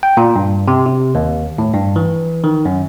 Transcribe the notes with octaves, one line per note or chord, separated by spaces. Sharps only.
G5
A#2
G2
C3
C3
D#2
A2
G2
E3
D#3
F#2